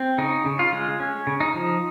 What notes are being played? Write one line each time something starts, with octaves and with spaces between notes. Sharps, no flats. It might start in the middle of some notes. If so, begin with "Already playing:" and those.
Already playing: C4
C#3 D#4
C#3
F4
G#3
C#4
C#3
D#4
F3